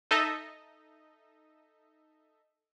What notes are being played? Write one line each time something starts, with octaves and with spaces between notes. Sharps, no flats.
D#4 A4 D#5 E5